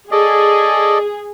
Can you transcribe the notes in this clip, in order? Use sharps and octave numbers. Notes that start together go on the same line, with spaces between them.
G#4 A4 D5 D#5